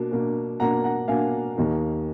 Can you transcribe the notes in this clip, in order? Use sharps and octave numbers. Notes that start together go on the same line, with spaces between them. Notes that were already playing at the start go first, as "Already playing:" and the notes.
Already playing: B2 A#3 D4
B2 A#3 D4
B2 A#3 D4 F#5 A#5
F#5 A#5
B2 A#3 D4 F5 G#5
D#2 D#3 A#3 D#4